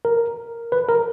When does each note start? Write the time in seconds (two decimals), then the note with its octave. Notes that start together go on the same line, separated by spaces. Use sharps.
0.05 A#4
0.72 B4
0.89 A#4